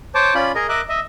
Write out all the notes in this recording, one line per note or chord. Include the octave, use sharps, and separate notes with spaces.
C5 C#5 A5 D6
C#4 F4 D5 B5
G#4 A#4 D#5 A#5
A#4 D#5 E5 D6 F#6
D#5 E5